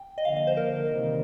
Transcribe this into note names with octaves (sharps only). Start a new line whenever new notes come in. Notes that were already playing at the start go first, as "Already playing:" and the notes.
Already playing: G5
D#5
D3 F3 A#3 F5
D#5
C5
A#4
C3 D#3 G3